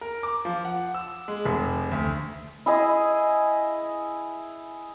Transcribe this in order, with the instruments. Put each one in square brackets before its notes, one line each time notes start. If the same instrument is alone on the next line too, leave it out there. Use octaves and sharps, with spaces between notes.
[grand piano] A#4
D6
F3
F#5
E6
G#3
F1
D2
[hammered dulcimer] E4 G#4 D#5